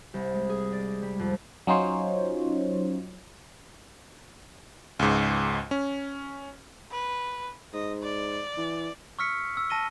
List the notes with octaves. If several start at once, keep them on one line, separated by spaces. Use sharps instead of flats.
C2
G#3
G#4
D5
G3
F2
F#3 C#4 D#4 F4 C5 C#5
C#2 G#2
C#4
B4
G#2 D#5
D5
E3
C#6 E6 F6 B6 C#7
E6
A5 A#6 D#7 G7